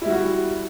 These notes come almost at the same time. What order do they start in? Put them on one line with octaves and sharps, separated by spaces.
E4 G3 F#4